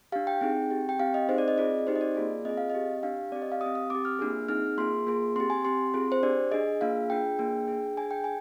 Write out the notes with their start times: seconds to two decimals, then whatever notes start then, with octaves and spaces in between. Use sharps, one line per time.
0.12 D4 G4 F5
0.27 G5
0.41 C4 D#4 G#4
0.71 C4 G4
0.89 G5
0.99 C4 G4 F5
1.14 D#5
1.29 C4 D#4 G#4 C5
1.38 D5
1.48 D#5
1.58 C4 F4 G#4 D5
1.87 C4 D#4 G4 C5
1.95 D#5
2.01 D5
2.16 A#3 F4 G#4
2.45 C4 F4 G#4 D#5
2.58 F5
2.70 C4 G4 D#5
3.03 D4 G4 F5
3.32 C4 G4 D5
3.42 D#5
3.52 F5
3.61 G4 D#6
3.66 C4
3.75 D#6
3.90 C4 G4 D6
4.05 F6
4.19 A#3 D4 F4 G#4
4.48 C4 D#4 G#4 F6
4.78 A#3 F4 G#4 C6
5.07 A#3 F4 G#4
5.36 C4 G4 C6
5.50 G#5
5.65 C4 G4 C6
5.94 C4 F4 G#4
6.12 C5
6.23 D4 G4 D5
6.51 D4 G#4 D#5
6.81 A#3 D4 F4 G#4 F5
7.10 D4 F4 G#4 G5
7.39 A#3 D4 G#4
7.68 D4 G#4
7.97 D4 G#4 G#5
8.11 G5
8.24 G#5